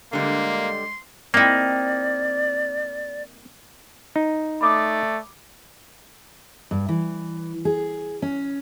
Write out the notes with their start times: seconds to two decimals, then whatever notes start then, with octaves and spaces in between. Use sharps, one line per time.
0.13 D3 G3 G#3 A#3 C6
1.34 A#3 C4 D#4 E4 D5
4.16 D#4
4.61 A3 D5 B5 D6 D#6
6.71 G2
6.89 E3
7.65 G#4
8.22 C#4